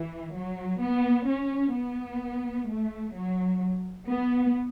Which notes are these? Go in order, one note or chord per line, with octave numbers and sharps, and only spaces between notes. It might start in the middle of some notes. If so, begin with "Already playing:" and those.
Already playing: E3
F#3
B3
C#4
B3
A3
F#3
B3